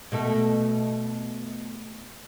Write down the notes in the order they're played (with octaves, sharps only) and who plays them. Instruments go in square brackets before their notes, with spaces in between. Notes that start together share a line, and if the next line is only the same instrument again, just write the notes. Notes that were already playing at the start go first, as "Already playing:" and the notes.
[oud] B2 A3 A4